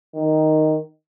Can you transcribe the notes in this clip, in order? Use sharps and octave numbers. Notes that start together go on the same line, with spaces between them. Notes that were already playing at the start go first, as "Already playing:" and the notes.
D#3